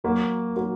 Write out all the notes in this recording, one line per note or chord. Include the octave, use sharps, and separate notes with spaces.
F#3 A#3 F#4
F#3 A#3 F#4